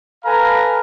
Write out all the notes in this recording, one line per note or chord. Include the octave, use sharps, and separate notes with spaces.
A4 B4 F5 G#5 A#5